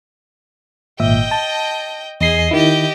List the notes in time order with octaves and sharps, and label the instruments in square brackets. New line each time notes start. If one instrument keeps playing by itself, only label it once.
[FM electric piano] G#1 A#2 E5 [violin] D#5 G5
[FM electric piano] A5
[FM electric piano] E2 C7 [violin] G#4 D#5
[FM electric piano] D#3 E4 [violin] G4 D#5